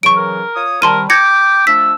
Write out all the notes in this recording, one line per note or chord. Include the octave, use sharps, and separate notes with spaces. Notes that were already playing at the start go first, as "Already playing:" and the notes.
C#3 E3 F#3 C#6 D7
A#4
F4 C#5 D#6
C3 D#3 G3 A#4 A5 C6 D#7
G5 D6 G#6 A#6 C#7
F3 A3 D4 E6 B6